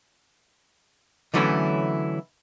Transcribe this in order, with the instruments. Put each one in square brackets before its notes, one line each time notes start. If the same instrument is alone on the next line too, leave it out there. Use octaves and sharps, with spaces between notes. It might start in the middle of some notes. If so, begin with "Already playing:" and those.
[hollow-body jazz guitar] D3 E3 F#3 A3 C#4 E4